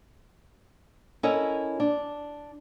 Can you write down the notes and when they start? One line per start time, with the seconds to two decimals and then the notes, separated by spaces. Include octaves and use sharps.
1.23 C#4 E4 A4 A#4 C#5 D#5
1.80 D4